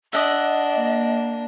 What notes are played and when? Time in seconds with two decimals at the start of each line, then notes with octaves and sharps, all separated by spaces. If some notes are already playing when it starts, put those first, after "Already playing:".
0.13 D4 D#5 E5 F#5 D#6
0.73 A#3